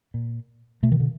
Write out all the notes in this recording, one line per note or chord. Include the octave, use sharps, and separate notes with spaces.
A#2
B2 A3
D#3
D3